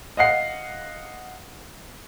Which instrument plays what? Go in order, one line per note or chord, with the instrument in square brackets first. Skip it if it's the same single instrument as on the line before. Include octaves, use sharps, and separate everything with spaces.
[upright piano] D#5 F5 F#5 C7